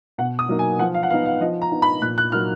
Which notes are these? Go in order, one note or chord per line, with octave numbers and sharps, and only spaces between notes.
B2 F#5
D#6
F#3 A#3 D#4
G#5
F3 F#5
F5
F#5
B3 D#4 F5
F5
F3 D#5
A#5
B3 D#4
B5
A#2 F#6
F#6
F#3 A#3 D#4 F6